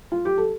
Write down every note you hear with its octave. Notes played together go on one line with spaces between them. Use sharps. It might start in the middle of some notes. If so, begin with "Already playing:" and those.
F4
G4
A4